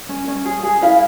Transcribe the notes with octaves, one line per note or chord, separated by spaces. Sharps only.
C#4
C#4
G#4
G#4
E4 F5